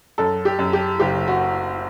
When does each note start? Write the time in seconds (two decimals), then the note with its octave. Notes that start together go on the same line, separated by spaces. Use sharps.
0.18 F#2 A4
0.45 G4
0.59 F#2
0.73 G4
1.00 F#1 G4
1.28 F#4